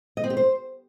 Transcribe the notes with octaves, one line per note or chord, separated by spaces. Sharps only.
D#5
C4
G4
C5